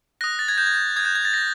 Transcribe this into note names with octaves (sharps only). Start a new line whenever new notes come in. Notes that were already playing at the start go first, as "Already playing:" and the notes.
D#6 F#6 A#6
A6
G#6
G6
G#6
G6
D#6 F#6 G#6
G6
G#6
A6
A#6